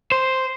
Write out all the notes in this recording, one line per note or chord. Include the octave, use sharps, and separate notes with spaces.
C5